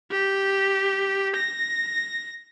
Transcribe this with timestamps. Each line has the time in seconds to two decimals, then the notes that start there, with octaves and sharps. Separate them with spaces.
0.11 G4
1.36 A#6